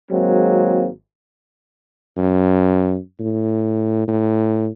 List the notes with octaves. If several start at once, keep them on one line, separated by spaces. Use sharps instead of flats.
G#1 F#3 G#3 A#3 C4
F#2
A2
A2